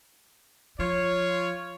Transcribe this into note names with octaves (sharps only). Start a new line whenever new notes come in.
F3 F4 C#5